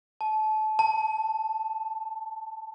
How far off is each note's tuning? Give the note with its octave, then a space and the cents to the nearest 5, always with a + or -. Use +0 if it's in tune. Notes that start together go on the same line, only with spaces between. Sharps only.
A5 -30
A5 +10